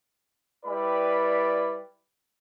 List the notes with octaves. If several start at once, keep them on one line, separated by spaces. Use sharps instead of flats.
G3 E4 B4 D5 B5